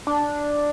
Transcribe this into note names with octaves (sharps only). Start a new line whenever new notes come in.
D4